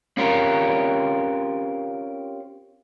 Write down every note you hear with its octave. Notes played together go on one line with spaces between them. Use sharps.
C4 C#4 F4 G4 A#4